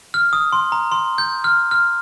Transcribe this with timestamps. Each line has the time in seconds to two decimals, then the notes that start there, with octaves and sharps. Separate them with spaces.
0.14 F6
0.33 D#6
0.52 C6
0.72 A#5
0.92 C6
1.18 G6
1.44 F6
1.71 F6